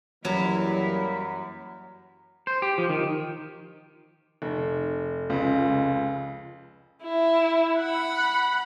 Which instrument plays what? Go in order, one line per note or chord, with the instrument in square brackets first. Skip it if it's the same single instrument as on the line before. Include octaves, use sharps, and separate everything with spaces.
[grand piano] F#2 [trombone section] E3 G3 A#3 [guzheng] F#3 [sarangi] E4
[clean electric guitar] C5
G4
F3
D#3
[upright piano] F1
[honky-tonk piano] C#2
[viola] E4
F#5 B5